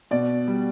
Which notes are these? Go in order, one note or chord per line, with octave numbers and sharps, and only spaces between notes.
B2 D5
G3